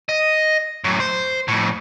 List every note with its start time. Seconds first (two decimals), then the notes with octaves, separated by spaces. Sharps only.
0.09 D#5
0.84 F#2 A2
1.00 C5
1.48 F2 A2